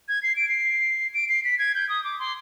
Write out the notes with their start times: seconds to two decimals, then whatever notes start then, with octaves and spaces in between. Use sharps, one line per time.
0.08 G#6
0.23 C7
0.36 D7
0.49 C7
1.14 D7
1.29 C7
1.44 B6
1.59 G#6
1.75 G6
1.89 D#6
2.05 D6
2.19 C6